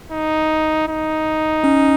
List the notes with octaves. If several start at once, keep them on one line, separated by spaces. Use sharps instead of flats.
D#4
D#4
C#4